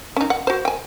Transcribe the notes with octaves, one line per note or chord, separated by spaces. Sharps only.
C#4 D#4
F#5
F#4 C5
G5 G#5